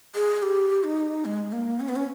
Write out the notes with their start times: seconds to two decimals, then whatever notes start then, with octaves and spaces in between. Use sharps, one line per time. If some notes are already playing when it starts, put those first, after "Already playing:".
0.15 G#4
0.43 G4
0.84 D#4
1.25 G#3
1.52 A#3
1.80 C#4
1.89 B3
1.96 C#4